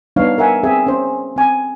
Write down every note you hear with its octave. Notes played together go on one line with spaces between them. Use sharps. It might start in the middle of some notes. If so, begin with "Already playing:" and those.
G3 B3 D4 D#4 C#5 F5
A#4 E5 F#5 G#5
C4 G#4 D5 E5 G#5
C#4 C5
C4 G#5